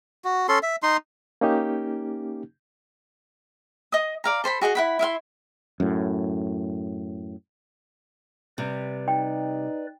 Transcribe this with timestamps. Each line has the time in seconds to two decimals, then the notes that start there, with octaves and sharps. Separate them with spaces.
0.24 F#4
0.49 C#4 A4 C6
0.63 E5
0.83 D#4 C6
1.41 A#3 C#4 D#4 G4
3.92 D#5 D#6
4.24 D5 F5 A#5
4.44 A4 C5 A#5 B5
4.61 F#4 G#4 D#5 F#5
4.75 E4 F#5 B5
4.99 E4 E5 F5 C6
5.80 F#2 A2
8.58 C3 G3 B4 D5
9.08 D#4 G5